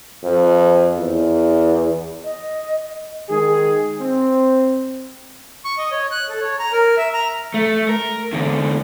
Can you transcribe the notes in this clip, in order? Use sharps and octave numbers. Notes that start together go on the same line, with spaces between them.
F2
E2
D#5
D#3 G#3 G#4
C4
C#6
D#5
C#5
F#6
A4
C#5
A#5
A#4
E5
A#5
A3
A#4
E2 D3